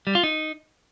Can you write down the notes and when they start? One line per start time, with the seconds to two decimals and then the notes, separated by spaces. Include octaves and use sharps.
0.07 G3
0.15 F4
0.23 D#4